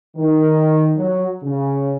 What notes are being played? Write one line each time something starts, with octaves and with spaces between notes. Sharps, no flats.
D#3
F#3
C#3